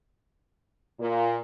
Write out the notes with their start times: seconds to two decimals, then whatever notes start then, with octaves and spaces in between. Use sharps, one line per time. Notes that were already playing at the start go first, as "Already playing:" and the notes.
1.00 A#2